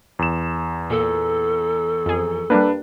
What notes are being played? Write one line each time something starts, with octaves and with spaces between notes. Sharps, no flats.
E2 E7
A#2 A4
F2 G#4
G3 A#3 D4 B4